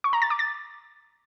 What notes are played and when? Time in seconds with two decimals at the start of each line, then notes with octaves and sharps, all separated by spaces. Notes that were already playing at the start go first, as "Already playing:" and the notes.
0.04 C#6
0.13 A#5
0.22 A6
0.30 D6
0.39 A6